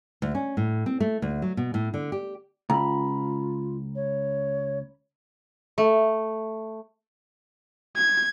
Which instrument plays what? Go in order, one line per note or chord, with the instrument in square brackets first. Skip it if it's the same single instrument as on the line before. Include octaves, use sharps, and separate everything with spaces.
[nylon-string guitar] D2
C#4
A2
C4
A3
D2
F#3
B2
A2
D3
G4
[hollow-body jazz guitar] C#2 [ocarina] F4 [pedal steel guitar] A#5 B5
[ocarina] C#5
[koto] A3
[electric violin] G#6